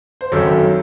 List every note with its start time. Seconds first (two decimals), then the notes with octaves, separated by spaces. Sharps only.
0.21 C5
0.32 G#1 F#2 D#3 F#3 A4